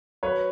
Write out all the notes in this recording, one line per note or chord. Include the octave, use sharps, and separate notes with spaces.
F#3 B4 C#5